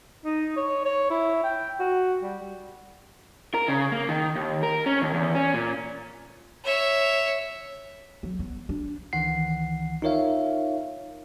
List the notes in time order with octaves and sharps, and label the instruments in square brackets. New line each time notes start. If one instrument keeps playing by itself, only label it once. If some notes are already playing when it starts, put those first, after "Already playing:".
[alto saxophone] D#4
C#5
C#5
E4
G5
F#4
G3
[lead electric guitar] A#4
C#3
A#3
D#3
D#2
A#4
C#4
D#2
E2
C#4
A#2
[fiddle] C#5 E5
[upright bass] F#3
B3
D4
[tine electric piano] C#2 D#3 E3 F#5 C7
D#4 F4 A#4 C#5 E5 F5